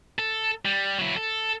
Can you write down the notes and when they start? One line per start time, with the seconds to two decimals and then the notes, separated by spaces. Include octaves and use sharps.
0.19 A4
0.65 G3
0.98 F#3 E4
1.16 A4